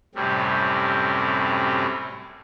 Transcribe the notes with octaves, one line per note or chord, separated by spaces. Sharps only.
F#2 A2 C3 G3